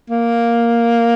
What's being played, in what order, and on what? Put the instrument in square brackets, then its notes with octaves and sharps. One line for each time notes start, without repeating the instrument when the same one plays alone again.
[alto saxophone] A#3